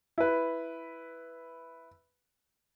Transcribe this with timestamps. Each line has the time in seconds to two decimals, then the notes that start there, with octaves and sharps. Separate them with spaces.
0.18 E4 B4